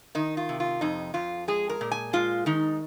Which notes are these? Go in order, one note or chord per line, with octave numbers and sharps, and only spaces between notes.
D#3 D#4
F4
C3
F4
F2 D#4
F2 F4
G#3 G#4
A#4
A#2
G#5
G#3 F4
D#3 D#4